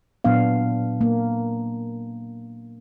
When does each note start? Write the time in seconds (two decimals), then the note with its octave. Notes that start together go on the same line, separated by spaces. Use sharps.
0.24 A#2 F#3 B3 D4 F5
1.01 A#3